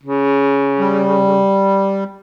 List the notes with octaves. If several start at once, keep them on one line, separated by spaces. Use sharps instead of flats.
C#3
G3